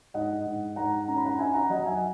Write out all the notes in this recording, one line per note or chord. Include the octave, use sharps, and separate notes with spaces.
G#2 D#5 F#5
G#2
G#2 F#5 A#5
C#4 A#5
B5
F#5 A#5
D#4 E5 G#5
F#5 A#5
F#3 D#5 F#5
E5 G#5